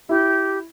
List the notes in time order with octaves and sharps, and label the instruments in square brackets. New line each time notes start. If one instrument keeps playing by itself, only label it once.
[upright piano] E4 [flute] G4